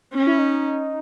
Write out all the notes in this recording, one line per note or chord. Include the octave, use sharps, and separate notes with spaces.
C#4
E4
D#4